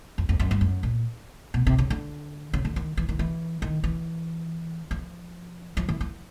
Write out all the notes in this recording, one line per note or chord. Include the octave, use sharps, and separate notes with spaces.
F2
F2
F#2
G2
F#2
A#2
B2
C3
C#3
D3
C#3
D3
D#3
E3
D#3
E3
D#3
E3
F3
F3
E3
F3